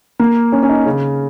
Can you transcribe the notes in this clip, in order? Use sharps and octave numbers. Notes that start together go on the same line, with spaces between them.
A#3
C#4
C#4
D#4
C#3